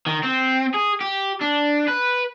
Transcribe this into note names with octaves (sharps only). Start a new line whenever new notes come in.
D#3
C4
G#4
G4
D4
B4